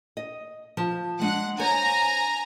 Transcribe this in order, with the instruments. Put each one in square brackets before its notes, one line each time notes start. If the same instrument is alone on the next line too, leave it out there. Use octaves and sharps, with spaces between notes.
[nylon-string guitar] D#5
F3 A5
[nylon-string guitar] G#3 D4 [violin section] F#5
[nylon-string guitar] C5 C#5 [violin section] G#5 A#5